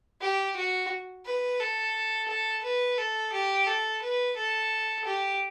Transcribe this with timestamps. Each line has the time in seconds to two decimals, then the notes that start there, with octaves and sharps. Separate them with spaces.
0.21 G4
0.57 F#4
1.26 B4
1.60 A4
2.28 A4
2.64 B4
2.98 A4
3.33 G4
3.67 A4
4.02 B4
4.36 A4
5.05 G4